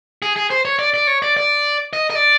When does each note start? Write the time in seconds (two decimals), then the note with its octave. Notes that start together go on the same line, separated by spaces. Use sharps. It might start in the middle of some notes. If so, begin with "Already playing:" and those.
0.22 G#4
0.36 G#4
0.50 C5
0.65 C#5
0.79 D5
0.94 D5
1.07 C#5
1.22 D5
1.37 D5
1.93 D#5
2.10 D#5
2.15 D5